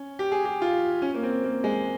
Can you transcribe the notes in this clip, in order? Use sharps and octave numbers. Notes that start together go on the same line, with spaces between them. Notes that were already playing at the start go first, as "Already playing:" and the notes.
Already playing: C#4
G4
G#4
G4
F4
C#4
A#3
C4
A#3
G#3